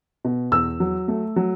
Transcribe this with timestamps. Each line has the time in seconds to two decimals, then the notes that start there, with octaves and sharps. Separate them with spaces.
0.25 B2
0.52 E2 E6
0.80 F#3
1.08 A3
1.36 F#3